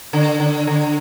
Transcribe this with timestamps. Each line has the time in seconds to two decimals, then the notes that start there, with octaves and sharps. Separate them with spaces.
0.13 D3
0.40 D3
0.67 D3